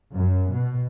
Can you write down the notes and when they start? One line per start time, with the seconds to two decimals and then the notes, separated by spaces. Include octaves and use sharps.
0.14 F#2
0.56 B2